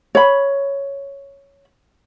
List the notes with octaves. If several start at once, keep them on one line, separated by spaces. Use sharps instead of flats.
C#5 B5